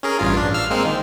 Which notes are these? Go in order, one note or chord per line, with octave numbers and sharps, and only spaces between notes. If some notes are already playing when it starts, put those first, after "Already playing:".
C#4 G#4 A#4
A1 G2 F4
D4
F5 E6 F6
G#3 A#3 C4
D#3